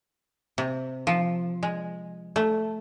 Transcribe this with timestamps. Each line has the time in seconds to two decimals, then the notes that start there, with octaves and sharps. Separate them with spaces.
0.58 C3
1.07 F3
1.63 G#3
2.36 A3